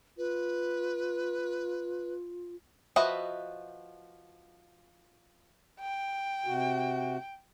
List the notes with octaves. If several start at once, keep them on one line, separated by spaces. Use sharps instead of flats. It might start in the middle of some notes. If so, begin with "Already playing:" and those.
F4 B4
F3 F#4 B4 D#5 E5
G5
C3 F#4